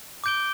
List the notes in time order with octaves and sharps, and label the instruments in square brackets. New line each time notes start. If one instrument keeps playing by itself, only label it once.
[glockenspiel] D6 G6 D7 G7